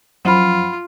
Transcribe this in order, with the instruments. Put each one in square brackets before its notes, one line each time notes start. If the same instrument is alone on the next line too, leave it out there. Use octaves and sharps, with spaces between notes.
[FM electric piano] F#2 F3 [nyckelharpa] F4 [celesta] F#5 B5